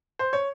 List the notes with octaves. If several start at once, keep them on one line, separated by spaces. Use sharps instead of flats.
C5
C#5